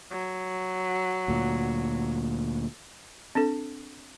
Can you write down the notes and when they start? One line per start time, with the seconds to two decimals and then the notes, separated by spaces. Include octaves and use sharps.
0.11 F#3
1.28 D2 A#2
3.35 C4 D4 A4